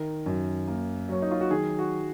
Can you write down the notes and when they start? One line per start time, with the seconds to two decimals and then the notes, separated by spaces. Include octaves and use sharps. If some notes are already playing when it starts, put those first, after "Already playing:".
Already playing: D#3 A#4
0.26 F#2
0.68 A#3
1.09 F#3 C#4
1.22 D#4
1.31 F4
1.41 F#4
1.50 D#3 G#4
1.79 F#4